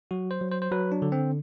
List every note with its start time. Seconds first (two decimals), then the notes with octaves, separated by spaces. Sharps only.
0.11 F#3 F#4
0.31 C5
0.41 F#3
0.52 C5
0.62 C5
0.71 F#3 B4
0.92 D4
1.02 D3
1.12 C4